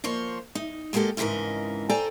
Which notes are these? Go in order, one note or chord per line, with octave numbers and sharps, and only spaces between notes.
F3 A#3 C5 C#5
D#4
F#3 G#3 A#3 G4 A4 D#5
F2 G#2 C#3 E3 A#4 D#5
A4 C5 D5 G5 G#5 A#5